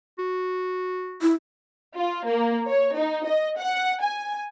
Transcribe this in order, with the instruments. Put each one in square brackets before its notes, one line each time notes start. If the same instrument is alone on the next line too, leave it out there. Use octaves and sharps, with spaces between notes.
[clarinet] F#4
[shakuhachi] E4
[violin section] F4
A#3
C#5
D#4
D#5
F#5
G#5